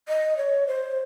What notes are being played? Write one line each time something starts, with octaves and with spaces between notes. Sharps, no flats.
D#5
C#5
C5